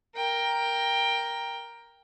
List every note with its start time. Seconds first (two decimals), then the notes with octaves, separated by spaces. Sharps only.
0.15 A#4 G5